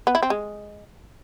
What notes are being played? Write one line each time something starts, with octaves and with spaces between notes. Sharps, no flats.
B3
E4
C4
G#3